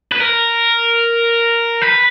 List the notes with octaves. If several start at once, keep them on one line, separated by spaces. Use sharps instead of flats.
B4
A#4
B4